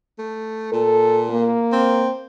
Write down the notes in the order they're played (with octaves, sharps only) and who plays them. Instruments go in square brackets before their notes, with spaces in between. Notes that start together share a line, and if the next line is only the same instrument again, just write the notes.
[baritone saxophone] A3
[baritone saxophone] A#2 [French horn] A4
[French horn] A#3
[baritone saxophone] C4